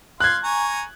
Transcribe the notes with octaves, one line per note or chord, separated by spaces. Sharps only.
F5 C6 F#6 G#6
G#5 A#5 C#6